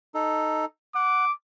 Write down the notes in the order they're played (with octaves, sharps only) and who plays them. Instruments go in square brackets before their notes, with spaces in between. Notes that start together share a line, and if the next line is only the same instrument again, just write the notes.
[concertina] D#4 A4
[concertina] F#5 [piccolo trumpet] D6